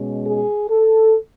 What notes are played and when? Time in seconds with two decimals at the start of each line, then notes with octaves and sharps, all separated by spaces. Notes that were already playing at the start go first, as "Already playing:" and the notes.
Already playing: B2 G#3 C#4
0.27 G#4
0.70 A4